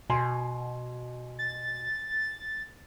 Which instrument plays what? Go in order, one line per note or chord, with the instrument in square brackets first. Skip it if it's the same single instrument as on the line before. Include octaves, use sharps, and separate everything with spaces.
[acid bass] B2 [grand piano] G#5 C6
[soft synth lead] A6